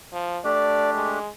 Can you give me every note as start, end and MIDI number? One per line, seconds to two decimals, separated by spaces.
0.12 0.39 53
0.44 1.19 57
0.44 1.19 62
0.44 1.19 67
0.44 0.94 74
0.94 1.29 56